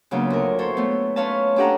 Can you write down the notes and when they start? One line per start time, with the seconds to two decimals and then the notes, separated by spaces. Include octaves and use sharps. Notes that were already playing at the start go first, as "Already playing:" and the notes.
0.11 C#3 F#3 A#3 B3 D4 F4
0.30 D2 A#4
0.58 E4 A4 C5 C#5
0.77 A3 B3
1.16 C#4 F4 B4 C#5 F5 A5
1.56 C#4 D4 G4 A4 F#5 A#5